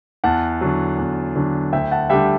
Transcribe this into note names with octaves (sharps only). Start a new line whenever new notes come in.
E2 F#5 A5
D3 F#3
E2
D3 F#3
D2 E5 G5
F#5 A5
D3 G3 E5 G5